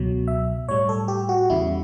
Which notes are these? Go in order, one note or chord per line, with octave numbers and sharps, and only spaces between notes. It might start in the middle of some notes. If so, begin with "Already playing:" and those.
Already playing: C#2 B2 F#3
E5
A2 G3 C#5
A4
G4
F#4
E2 C#3 G3 E4